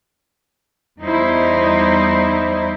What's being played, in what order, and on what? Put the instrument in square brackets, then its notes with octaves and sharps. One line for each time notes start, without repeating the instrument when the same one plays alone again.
[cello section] E2 G3 D#4 E4 C5